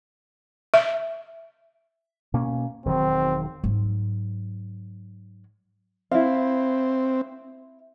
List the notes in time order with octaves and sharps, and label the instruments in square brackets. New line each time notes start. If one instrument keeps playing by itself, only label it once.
[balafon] E5
[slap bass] B2 A#3 C#4
[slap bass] E1 D#3 F#3 [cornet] C4
[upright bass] G#2 F#3
[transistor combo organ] C4 [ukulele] E4 F5